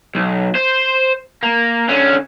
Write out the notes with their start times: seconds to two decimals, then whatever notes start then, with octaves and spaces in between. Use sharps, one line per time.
0.15 B1
0.55 C5
1.43 A#3
1.89 D3 C#4